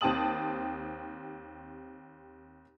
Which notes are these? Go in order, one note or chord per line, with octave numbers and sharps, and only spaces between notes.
D#2 C4 G4 A5 D#6 F#7